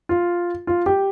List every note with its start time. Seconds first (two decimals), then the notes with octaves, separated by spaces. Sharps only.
0.09 F4
0.67 F4
0.86 G4